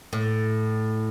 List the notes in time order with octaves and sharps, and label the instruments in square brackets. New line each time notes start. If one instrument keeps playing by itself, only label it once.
[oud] A2